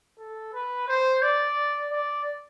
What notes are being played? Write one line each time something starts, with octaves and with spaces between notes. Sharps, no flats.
A4
B4
C5
D5
D5